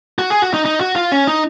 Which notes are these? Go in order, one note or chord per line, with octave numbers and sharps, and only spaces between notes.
F#4
G#4
F#4
D#4
D#4
F#4
F4
C#4
D#4